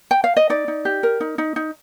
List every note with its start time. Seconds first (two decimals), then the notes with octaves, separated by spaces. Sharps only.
0.11 G5
0.24 F5
0.37 D#5
0.50 D#4 D5
0.68 D#4
0.85 G4
1.03 A#4
1.20 D#4
1.38 D#4
1.56 D#4